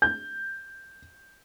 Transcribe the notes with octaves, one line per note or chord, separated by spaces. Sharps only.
G6